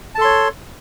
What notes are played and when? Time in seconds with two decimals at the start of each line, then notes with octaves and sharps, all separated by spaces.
0.15 A5
0.18 A4
0.21 C6
0.24 C#5